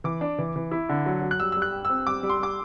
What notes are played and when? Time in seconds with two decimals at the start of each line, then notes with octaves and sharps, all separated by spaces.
0.04 E3 D6
0.21 D4
0.38 E3
0.56 E3
0.71 E4
0.89 D3
1.06 F#3
1.22 F#3
1.31 F#6
1.40 G3 E6
1.52 G3 E6
1.62 F#6
1.72 G4
1.85 C4 E6
2.07 G3 D6
2.23 G3
2.29 C6
2.39 G3 D6